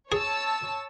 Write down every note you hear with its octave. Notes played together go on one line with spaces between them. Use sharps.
G#4 C#5 A5 E6